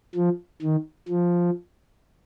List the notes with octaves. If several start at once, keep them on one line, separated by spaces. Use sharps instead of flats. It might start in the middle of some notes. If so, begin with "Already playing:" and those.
F3
D#3
F3